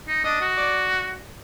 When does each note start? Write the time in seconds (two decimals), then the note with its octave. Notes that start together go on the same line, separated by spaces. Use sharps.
0.08 D#4
0.25 D4 D#5
0.41 F#4
0.57 D5